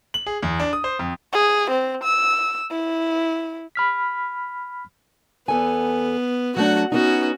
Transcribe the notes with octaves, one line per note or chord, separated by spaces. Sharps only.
F#7
G#4
E2
D4
D#6
C5
F2
G#4
C4
E6
E4
B5 F6 B6
E2 B3 A4 G#5
F#3 A3 D4 F#4 F#5
B3 C#4 D#4 F#4